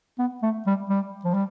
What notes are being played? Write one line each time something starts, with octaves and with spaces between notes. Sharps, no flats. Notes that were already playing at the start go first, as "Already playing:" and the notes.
B3
A3
G3
G3
F3
G3